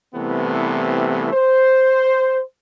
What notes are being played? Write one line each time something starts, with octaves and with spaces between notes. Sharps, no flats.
C2 C3 E3 A3 B3
C5